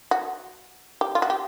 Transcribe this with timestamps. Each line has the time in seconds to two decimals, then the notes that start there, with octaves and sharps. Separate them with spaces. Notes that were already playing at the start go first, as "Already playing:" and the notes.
0.11 F#4
1.01 G4
1.15 F4
1.22 F#4
1.30 G4